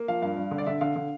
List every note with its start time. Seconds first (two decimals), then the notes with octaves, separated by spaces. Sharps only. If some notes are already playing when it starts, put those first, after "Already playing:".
Already playing: A#3
0.08 F3 F5
0.22 G2 F5
0.37 G2
0.51 D3
0.58 D5
0.66 D3 E5
0.81 D3 F5
0.96 D3